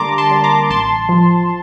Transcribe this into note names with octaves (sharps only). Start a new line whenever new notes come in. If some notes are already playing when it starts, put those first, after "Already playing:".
Already playing: D3 G3 A#3 A5 A#5 C6 D6
A5 C6
G3
A#5 D6
A1 A5 C6
F3